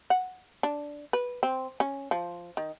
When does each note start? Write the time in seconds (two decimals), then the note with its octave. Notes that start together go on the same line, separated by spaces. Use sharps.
0.10 F#5
0.63 D4
1.13 B4
1.43 C4
1.80 C#4
2.11 F3
2.57 D#3